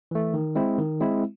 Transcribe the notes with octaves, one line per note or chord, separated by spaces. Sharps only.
E3 A3
D#3
G#3 C4 E4
D#3
G#3 C4 E4